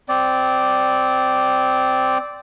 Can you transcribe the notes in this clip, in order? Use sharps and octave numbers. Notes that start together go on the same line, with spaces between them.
C4 D5